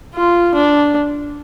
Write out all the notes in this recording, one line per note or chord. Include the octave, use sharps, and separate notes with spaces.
F4
D4